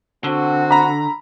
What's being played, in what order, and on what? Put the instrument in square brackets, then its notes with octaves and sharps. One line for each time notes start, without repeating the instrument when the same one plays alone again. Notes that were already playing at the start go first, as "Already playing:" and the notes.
[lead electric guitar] D3 [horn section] C4 F#4
[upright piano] A#5 B5